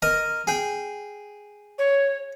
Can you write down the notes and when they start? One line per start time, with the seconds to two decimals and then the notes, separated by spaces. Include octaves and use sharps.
0.02 A#4 D#5 A#5
0.47 G#4 G5
1.78 C#5